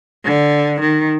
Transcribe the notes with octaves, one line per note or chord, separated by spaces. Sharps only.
D3
D#3